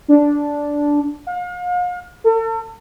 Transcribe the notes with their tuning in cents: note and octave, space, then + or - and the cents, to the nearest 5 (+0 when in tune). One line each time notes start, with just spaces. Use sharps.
D4 -10
F5 +40
A4 +40